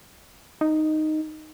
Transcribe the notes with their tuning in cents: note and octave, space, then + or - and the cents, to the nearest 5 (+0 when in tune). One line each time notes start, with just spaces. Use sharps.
D#4 -5